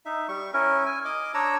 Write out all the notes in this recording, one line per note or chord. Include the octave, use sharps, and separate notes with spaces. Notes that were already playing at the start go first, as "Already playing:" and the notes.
D#4 E5
G3 C#6
C#4 E4 A#4
G#5
D#5 D6
D4 C#5 A#5 E6